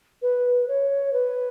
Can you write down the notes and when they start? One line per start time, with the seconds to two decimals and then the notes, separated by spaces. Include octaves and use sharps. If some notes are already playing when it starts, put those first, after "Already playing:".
0.22 B4
0.68 C#5
1.13 B4